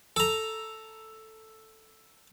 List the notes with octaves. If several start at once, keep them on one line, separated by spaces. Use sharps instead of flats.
A4 A#5